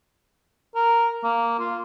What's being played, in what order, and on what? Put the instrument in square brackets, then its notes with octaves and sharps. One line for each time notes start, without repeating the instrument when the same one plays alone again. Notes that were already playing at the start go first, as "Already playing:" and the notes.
[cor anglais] A#4
A#3
F4